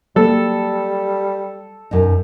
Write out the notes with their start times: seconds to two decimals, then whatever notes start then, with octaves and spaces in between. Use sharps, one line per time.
0.16 F#3 G3 A#3 A4
1.91 F#2 B2 D#4